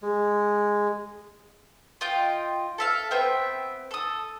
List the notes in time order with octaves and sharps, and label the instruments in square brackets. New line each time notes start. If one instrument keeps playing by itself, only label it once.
[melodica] G#3
[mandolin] F4 D#5 G5
A4 E5 F5
B3 C4 E5 G5
A4 D#6